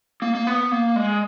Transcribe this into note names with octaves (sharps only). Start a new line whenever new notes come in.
A#3
A#3
B3
A#3
G#3